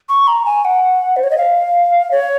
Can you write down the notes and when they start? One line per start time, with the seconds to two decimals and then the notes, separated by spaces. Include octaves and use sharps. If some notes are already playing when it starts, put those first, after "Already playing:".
0.09 C#6
0.27 A#5
0.45 G#5
0.65 F#5
1.16 C5
1.23 C#5
1.31 D#5
1.37 F5
2.11 C#5